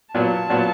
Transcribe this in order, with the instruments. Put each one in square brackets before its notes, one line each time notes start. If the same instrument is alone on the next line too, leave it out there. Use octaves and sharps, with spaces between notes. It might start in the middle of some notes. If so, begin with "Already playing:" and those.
[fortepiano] A#2 F#3 B3 [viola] A5
[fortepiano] A#2 F#3 B3